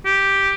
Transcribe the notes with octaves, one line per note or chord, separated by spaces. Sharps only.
G4